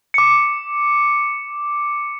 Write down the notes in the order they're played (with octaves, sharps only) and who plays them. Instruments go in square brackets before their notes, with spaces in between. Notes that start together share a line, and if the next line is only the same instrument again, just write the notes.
[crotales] D6 C#7